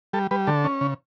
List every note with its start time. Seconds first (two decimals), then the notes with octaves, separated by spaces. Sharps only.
0.13 G3 A4
0.31 G3 B4
0.47 D3 A4
0.64 C#4
0.81 C#3